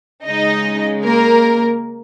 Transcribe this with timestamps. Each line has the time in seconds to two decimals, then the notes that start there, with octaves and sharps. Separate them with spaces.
0.24 C#3 G#3 D#4 D#5
1.04 A#3 A#4